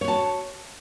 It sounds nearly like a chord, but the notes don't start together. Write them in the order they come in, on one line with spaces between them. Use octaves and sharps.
C#5 F#4 A5